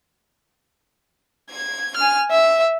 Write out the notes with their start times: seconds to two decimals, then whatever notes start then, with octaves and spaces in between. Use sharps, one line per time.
1.51 G#6
1.97 G#5 F6
2.31 E5